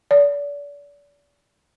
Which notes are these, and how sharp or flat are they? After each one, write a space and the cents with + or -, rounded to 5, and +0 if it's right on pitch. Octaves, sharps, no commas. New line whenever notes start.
D5 -35